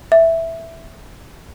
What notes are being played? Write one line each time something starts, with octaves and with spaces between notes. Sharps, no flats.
E5